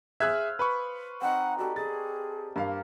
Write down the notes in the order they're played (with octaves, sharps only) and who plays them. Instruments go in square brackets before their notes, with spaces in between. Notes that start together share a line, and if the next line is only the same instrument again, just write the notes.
[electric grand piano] G#4 E5 [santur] C5 F5 [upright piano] E6 F#6 G#6
[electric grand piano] B4 B5 C#6 [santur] C5 D#6
[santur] C4 D#4 [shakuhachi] F#5
[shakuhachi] F#4 [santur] G4 A4 D5
[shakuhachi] G#4 [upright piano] A6
[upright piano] G2 F5 [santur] A#3 G4 A#4